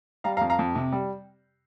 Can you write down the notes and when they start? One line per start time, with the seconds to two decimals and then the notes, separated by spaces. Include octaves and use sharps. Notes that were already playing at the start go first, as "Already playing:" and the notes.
0.24 G3 F5 A#5
0.37 F5 A#5
0.41 F2
0.50 F5 A#5
0.59 F2
0.75 C3
0.92 G3